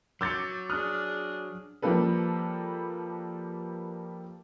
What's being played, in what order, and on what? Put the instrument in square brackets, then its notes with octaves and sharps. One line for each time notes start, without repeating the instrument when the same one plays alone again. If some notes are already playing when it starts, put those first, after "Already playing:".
[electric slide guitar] F#3 [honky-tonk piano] D6 G6 A6 [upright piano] E6 C#7
[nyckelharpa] D4 G#4 [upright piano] D#6 F6 F#6
[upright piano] F3 G3 A#3 G4 A4 B4